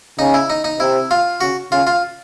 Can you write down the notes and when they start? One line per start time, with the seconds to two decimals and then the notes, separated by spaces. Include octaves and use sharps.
0.19 C#3 D#4
0.34 E4
0.50 D#4
0.64 D#4
0.79 C3 E4
1.11 F4
1.41 C#3 F#4
1.72 C#3 F4
1.87 F4